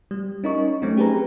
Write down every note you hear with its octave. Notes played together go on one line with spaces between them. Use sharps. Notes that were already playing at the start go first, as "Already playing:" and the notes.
G3
C#4 D#4 A#4 D#5 C#6
F#3 A3 C4 C#4 D#4
G4 G#4 B4 A#5